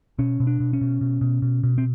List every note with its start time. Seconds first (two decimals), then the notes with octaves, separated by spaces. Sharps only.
0.19 B2 C#4
0.40 B2
0.47 D4
0.60 B2
0.73 C#4
0.81 B2
1.01 B2
1.21 B2
1.42 B2
1.63 B2
1.78 C4